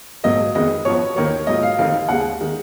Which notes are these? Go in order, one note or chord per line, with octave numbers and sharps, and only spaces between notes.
A#1 G#2 F#3 A#3 D#5
F2 D#3 G#3 B3 D#5
F#2 F3 B3 C#5
D#2 D#3 A#3 C#5
G#2 F#3 B3 F4 D#5
F5
F1 F2 D#3 A#3 D#4 F5
D#2 C#3 G#3 F#5
D#3 G#3